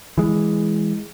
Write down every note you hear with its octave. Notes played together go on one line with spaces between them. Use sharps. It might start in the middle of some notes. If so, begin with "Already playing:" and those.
E3 G#3